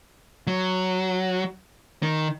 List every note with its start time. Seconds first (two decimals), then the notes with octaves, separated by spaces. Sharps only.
0.47 F#3
2.03 D#3